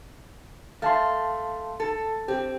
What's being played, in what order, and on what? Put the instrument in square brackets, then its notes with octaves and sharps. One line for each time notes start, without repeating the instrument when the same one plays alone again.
[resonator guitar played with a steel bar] A3 [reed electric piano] F5 A5 C6
[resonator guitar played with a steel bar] A4
[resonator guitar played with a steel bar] C4 [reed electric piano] G4